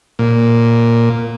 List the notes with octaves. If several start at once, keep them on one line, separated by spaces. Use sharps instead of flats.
A#2